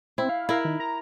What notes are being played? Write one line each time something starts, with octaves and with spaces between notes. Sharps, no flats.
C4 E4
F5
E4 A#4
D#3
A#5